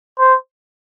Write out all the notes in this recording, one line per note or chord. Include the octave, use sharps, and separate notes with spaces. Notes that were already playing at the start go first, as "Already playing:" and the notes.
C5